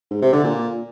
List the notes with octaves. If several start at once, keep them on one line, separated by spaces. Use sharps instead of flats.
G#2
C3
D3
A#2